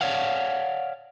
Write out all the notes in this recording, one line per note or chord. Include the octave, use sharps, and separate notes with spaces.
C#5 D5 F5 F#5